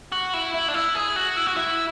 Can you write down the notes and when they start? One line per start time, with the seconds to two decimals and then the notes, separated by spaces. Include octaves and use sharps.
0.12 F#4
0.34 E4
0.54 E4
0.68 D4
0.74 E4
0.95 G#4
1.16 F#4
1.37 E4
1.46 F#4
1.57 E4